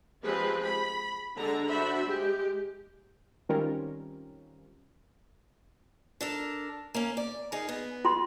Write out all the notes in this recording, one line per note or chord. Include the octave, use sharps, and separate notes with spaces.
F3 G#3 C4 G4 G#4 B4
B5
D3 G#3 D4 A4 A#5
D4 F#4 C5 E5 B5
G#3 G4
D#3 G3 C4 C#4 F4 A#4
D4 A4 A#4
A#3 C#4
D5
D#4 G#4 A#4
B3
F4 C6